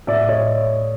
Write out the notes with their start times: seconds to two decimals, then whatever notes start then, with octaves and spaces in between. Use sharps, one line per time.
0.07 A2 D5 E5
0.29 C#5 D#5